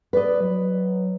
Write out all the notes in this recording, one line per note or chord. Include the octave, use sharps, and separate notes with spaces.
B4 D5 D#5
F#3